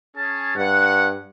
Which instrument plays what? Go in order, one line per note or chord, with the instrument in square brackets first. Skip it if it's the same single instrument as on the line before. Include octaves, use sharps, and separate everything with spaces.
[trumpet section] C#4 G#4 A5
[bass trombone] G2 [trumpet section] F#5